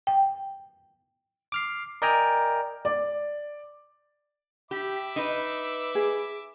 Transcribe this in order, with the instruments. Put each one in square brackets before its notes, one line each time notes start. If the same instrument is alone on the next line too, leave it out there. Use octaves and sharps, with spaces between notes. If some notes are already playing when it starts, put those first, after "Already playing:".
[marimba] G5
[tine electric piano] D6 F6 C7
A#4 D5 D#5 G5 G#5 A#5
[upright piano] D5
[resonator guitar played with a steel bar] G4 [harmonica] E5 B5 D6
[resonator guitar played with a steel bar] D#4 B4
[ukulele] G#4